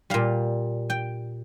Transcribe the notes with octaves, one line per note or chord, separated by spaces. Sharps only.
A#2 G3 F5
G5